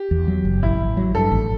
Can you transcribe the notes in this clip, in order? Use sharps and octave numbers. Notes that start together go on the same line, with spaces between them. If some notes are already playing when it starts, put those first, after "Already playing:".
Already playing: G4
E2
F#3
F#1
A1 E4
A1
F#3
G2 A4
A1